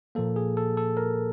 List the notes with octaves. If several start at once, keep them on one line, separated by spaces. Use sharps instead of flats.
A#2 F3 A#3 A4
G#4
A4
A4
A#4